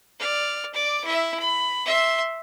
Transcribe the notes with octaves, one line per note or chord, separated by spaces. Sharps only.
D5 F6
D5 D6
E4 E5
B5
E5 C6